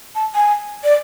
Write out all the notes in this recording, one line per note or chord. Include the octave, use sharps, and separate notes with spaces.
A5
G#5
D5